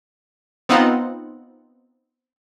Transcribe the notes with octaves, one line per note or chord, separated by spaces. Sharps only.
B3 C4 D#4 F4 F#5